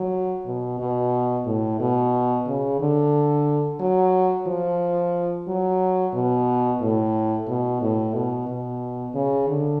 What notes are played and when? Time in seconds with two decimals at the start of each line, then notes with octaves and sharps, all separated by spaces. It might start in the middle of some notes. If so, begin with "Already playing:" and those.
Already playing: F#3
0.46 B2
0.80 B2
1.46 A2
1.80 B2
2.47 C#3
2.80 D3
3.80 F#3
4.47 F3
5.48 F#3
6.13 B2
6.81 A2
7.48 B2
7.82 A2
8.14 B2
8.48 B2
9.14 C#3
9.48 D3